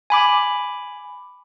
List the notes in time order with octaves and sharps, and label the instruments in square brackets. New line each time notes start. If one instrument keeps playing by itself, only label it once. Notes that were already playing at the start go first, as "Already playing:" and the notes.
[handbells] G#5 B5 D6